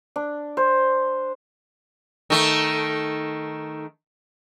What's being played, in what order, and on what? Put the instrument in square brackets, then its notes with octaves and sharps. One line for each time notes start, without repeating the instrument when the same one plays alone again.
[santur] D4
C5
[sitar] D#3 A3